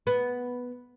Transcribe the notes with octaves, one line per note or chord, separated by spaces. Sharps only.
B3